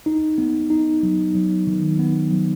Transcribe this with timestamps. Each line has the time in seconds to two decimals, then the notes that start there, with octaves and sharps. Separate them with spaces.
0.06 D#4
0.38 B3
0.70 D#4
1.03 F#3
1.35 F#3
1.67 D#3
1.99 B3
2.31 F#3